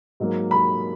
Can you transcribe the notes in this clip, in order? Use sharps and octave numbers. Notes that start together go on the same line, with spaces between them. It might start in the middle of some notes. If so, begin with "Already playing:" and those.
G#2 F#3 A#3
B5